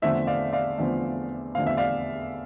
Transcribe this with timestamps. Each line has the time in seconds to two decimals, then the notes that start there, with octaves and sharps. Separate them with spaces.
0.02 E2 D3 F3 A3 C4 E5
0.27 D5 F5
0.53 D5 F5
0.78 E2 D3 F3 A3 C4
1.55 E2 D3 F3 A3 C4 F5
1.67 E5
1.77 D5 F5